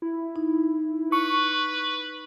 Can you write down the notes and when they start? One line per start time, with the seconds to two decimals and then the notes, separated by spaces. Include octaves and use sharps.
0.02 E4
0.36 D#4
1.12 B4 C#6